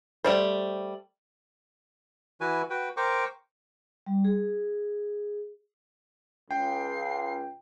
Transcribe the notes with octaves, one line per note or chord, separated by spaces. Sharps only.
G3 A3 C5
E3 E4 F#4 B4 G#5
F#4 B4 G5
A#4 C5 G5 C#6 D6
G3
G#4
C#2 G5 C7